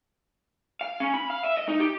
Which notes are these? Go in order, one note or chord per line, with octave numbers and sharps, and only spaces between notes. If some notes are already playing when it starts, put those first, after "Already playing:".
F5
C#4
B5
F5
E5
D#5
D#4
G4